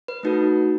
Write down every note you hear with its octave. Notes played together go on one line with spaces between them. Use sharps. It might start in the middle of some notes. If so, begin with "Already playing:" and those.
B4
A3 D#4 F#4 A4